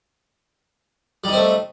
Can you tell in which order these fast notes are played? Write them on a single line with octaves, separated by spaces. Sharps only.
G3 D#4 C4 A3